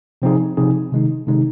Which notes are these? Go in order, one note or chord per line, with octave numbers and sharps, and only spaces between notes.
C3 F3 C4 D#4 G#4
C3 F3 C4 D#4 G#4
C3 D#3 G#3 D#4
C3 D#3 G#3 D#4